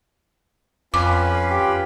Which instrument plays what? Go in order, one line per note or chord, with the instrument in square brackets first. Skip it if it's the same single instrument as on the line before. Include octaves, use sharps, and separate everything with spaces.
[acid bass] F2 [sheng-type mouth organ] C#4 F4 B4 [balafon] D6
[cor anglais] G4